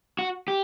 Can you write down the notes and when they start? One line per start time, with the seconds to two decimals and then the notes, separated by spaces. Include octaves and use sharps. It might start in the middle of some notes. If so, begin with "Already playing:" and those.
0.19 F#4
0.48 G4